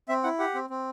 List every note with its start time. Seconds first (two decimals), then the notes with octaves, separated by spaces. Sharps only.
0.09 C4 E5
0.24 E4 F#5
0.39 G4 F#5
0.55 C4
0.70 C4